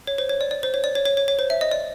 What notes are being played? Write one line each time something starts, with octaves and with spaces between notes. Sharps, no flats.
C#5
C5
C#5
D5
D5
C5
C#5
D5
C#5
C#5
C#5
C#5
C5
E5
D#5
D5